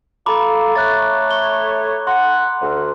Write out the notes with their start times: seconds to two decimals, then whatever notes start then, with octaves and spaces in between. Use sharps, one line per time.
0.26 F4 A4 A#5 B5 D6
0.75 A3 C#5 F#6 A6
1.31 G7
2.07 F#5 C6
2.61 D2